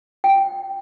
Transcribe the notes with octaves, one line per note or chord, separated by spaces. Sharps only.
G5